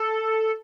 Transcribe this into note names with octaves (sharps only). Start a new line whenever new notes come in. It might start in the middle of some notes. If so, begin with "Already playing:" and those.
Already playing: A4